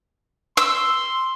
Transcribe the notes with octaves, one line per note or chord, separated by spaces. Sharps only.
C6 E6